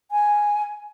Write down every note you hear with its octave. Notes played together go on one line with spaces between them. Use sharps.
G#5